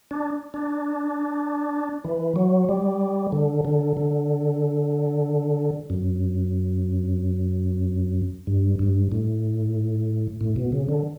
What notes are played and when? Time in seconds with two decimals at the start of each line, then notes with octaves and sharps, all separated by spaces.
0.11 D4
0.54 D4
2.04 E3
2.36 F#3
2.69 G3
3.32 D3
3.65 D3
3.97 D3
5.90 F#2
8.47 G2
8.79 G2
9.12 A2
10.41 A2
10.56 B2
10.72 C#3
10.89 D3